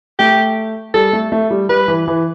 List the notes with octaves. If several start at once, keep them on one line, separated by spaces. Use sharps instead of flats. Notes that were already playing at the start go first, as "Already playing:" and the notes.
A3 G4
G3 A4
A3
A3
G3
G3 B4
E3
E3